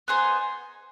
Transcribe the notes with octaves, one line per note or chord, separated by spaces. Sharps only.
B3 D#4 G#4 C5